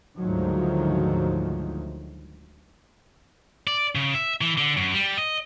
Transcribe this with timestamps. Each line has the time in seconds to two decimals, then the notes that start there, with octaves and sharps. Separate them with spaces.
0.18 D2 G#2 D3 D#3 F3 F#3
3.67 D5
3.95 C#3
4.14 E5
4.41 E3
4.58 D3
4.77 F#2
4.94 G3
5.18 D#5